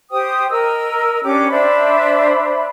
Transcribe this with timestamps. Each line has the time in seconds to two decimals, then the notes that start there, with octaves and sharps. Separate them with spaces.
0.11 G4 C5 G5 D#6
0.50 A#4 D#5 E6
1.24 C#4 D4 G4 D6
1.50 D4 C5 E5 B5